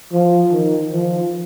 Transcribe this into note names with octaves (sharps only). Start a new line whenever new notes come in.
F3
D#3
F3